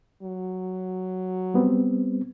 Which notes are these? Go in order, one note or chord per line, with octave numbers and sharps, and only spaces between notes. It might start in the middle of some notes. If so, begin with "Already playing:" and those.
F#3
G3 B3 C4